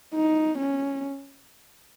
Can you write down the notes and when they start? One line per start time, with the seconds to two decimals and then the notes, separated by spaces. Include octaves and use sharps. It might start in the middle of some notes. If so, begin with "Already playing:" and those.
0.14 D#4
0.58 C#4